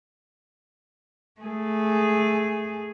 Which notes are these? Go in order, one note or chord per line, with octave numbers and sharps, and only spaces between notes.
A3 G#4